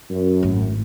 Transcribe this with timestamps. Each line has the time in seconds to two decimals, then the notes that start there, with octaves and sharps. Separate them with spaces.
0.10 F#2
0.43 G#1 A2